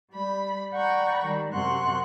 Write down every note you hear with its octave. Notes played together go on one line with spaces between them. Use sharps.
G3 B5
D5 F#5 G5 A#5 B5 C#6
D#3 G3
F#2 C3 F#5 C6 C#6 F#6